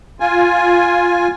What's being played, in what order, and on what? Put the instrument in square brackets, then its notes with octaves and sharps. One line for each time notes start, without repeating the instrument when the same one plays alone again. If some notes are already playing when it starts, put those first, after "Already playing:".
[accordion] F4 G#5